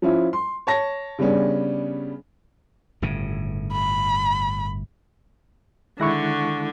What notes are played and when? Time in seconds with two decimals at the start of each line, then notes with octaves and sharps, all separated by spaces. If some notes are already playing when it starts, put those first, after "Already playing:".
0.02 F3 C#4 E4 F4
0.33 C6
0.67 C#5 A5 A#6
1.19 C#3 G3 B3 C#4 D4
3.02 G1 A2 C#3
3.73 B5
6.00 D3 D#3 G#3 E4 C#6 F#6 A#6